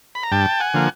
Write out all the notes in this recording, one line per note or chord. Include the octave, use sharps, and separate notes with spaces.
B5
A#5
G2 G5 A5
F#5 G#5
D3 F3 A#3